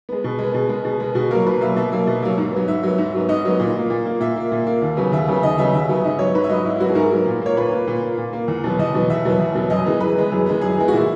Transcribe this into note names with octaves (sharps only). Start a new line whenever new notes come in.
G#3 B3
B2
G#3
B3
B2
G#3 B3
B2
G#3 B3
B2 F#4
F#3 A#3 A#4
B2 B4
F#3 A#3 E5
B2 E5
F#3 A#3
B2
F#3 A#3
G#2
F#3 B3
G#2 E5
F#3 B3
G#2
F#3 B3
G#2 D#5
F#3 B3
A#2
A#3
A#2
A#3
A#2 E5
A#3
A#2
A#3
D#2
C#3 F#3 B3
D#2 E5
C#3 F#3 B3
D#2 D#5
C#3 F#3 B3 E5
D#2 E5
C#3 F#3 B3
G#2 D#5
F#3 B3 C#5
G#2 B4
E5
F#3 B3 D#5
G#2 E4
E4
F#3 B3 F#4
G#4
G#2 A#4
F#3 B3
A#2
A#3 C#5
A#2 B4
A#3
A#2
A#3
A#2
A#3
E2
B2 F#3 B3
E2 D#5
B2 F#3 B3
E2 E5
B2 F#3 B3
E2
B2 F#3 B3
F#2 D#5
E3 G#3 B3
F#2 B4
E3 G#3 B3
F#2
E3 G#3 B3
F#2 G#4
E3 G#3 B3
F#4
A#2 E4